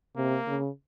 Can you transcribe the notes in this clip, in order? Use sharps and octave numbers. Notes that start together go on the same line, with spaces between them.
C3 A#3
C#3